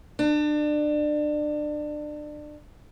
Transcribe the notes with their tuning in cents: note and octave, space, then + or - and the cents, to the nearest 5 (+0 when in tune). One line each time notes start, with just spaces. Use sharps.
D4 +25